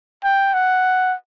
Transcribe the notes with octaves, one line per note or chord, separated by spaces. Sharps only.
G5
F#5